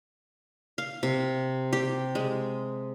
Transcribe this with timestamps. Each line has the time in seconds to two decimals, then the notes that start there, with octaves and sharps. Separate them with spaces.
0.78 F5
1.03 C3
1.73 G4
2.15 G#3